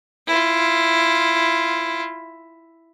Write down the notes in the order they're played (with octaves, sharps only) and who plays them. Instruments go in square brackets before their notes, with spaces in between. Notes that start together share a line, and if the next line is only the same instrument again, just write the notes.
[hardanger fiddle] E4 F4